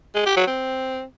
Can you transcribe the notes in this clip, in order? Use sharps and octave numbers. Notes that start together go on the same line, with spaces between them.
G#3
G4
F#3
C4